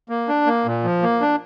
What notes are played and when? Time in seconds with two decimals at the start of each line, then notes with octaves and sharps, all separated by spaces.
0.09 A#3
0.28 D4
0.46 A#3
0.66 A#2
0.84 F3
1.02 A#3
1.21 D4